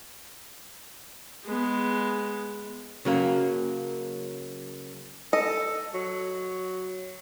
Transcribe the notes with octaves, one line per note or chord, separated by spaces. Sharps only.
G#3 B3
C#3 F#3 A#3
A4 D#5
F#3